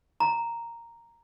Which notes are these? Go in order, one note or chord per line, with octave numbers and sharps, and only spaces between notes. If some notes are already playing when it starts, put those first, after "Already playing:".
A#5